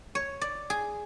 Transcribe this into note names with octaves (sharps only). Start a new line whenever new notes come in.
C#5
D5
G#4